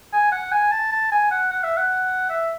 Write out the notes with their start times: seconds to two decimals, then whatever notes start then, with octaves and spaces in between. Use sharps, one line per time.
0.13 G#5
0.32 F#5
0.52 G#5
0.72 A5
0.92 A5
1.12 G#5
1.31 F#5
1.51 F#5
1.64 E5
1.77 F#5
2.30 E5